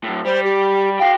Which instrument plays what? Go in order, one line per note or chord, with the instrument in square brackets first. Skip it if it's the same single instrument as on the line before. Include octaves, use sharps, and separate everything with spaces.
[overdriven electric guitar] A2 F#3
[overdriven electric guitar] G3 [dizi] C5
[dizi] G4
[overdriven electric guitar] F#4 G5 [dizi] F5